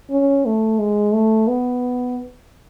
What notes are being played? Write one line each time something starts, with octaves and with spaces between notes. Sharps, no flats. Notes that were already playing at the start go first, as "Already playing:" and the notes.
C#4
A3
G#3
A3
B3